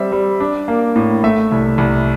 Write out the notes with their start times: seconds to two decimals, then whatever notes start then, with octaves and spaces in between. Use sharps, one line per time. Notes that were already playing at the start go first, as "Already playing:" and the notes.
Already playing: G3 C4 E5
0.12 G3
0.40 D4
0.68 A#3
0.96 A2
1.24 A3 E5
1.52 C2
1.78 C2